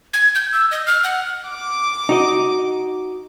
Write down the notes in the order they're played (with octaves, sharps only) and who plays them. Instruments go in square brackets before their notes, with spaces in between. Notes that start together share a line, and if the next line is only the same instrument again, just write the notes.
[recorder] G#6
G6
E6
D#5
F6
F#5
[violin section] D6
[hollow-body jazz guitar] D#4 F#4 D#5